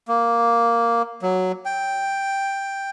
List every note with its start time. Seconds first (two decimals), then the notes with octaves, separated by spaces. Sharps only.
0.08 A#3
1.22 F#3
1.65 G5